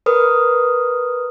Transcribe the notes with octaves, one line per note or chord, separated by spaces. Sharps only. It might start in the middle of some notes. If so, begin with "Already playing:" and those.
A#4 B4 D#6 F6